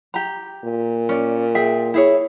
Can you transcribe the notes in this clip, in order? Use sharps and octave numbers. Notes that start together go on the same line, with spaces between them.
G4 A#5
A#2
C#4 D5
G#4 E5 G5
E4 G#4 C#5